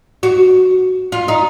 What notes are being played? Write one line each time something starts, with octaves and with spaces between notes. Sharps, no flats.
F#4
F4
D#4